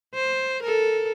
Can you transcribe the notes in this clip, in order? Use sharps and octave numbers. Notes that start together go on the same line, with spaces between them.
C5
A4 A#4